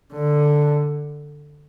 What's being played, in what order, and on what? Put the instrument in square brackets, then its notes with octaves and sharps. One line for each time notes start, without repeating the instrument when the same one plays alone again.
[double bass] D3